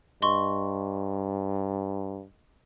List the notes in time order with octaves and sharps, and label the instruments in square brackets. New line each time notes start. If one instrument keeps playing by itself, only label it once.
[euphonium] G2 [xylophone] D#5 C6 C#6